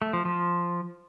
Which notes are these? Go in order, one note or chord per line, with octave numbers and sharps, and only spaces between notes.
A3
F3
F3